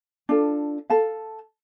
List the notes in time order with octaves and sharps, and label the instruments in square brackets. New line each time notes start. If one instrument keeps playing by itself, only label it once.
[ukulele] D4 F4 A4
A4 F5 A5